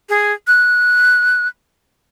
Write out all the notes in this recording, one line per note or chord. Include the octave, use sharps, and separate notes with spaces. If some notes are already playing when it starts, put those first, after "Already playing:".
G#4
F#6